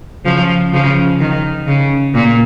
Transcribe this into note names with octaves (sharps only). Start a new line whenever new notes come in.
C#3 F3
C#3 F3
D#3
C#3
A#2